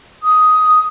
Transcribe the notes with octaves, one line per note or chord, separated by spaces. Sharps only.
D#6